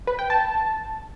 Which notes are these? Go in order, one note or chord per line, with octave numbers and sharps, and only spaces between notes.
B4
G5
A5